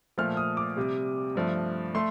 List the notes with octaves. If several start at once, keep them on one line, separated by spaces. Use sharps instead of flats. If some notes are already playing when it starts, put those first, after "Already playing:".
A#2 F3 A3 F6
D#6
D6
C3 G3
G2 F3 A3
A3 C6